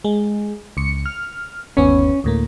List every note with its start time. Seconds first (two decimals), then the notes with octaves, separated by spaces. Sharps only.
0.04 G#3
0.77 C#2 C#7
1.06 F6
1.77 G1 D#2 B3 C#4
2.24 D2 A2 A#3